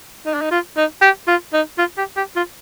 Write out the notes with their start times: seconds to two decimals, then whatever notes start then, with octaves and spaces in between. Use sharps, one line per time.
0.26 D#4
0.34 D4
0.41 D#4
0.51 F4
0.77 D#4
1.02 G4
1.27 F4
1.53 D#4
1.78 F4
1.98 G4
2.17 G4
2.36 F4